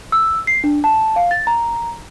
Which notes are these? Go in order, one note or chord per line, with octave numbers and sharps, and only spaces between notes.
E6
C7
D4
A5
F5
A6
A#5